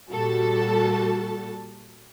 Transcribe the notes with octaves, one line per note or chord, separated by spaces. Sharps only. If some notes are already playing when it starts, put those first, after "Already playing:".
A#2 G3 F#4 A4 A5